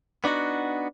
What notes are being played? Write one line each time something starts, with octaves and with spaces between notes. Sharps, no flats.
B3 D4 D#4 F#4